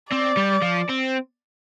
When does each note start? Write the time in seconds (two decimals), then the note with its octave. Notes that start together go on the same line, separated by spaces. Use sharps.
0.11 C4 D5
0.37 G3
0.62 F3
0.89 C4